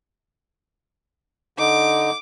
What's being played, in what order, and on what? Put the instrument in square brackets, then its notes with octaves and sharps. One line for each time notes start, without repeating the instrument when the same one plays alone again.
[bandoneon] D3 D#4 [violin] D6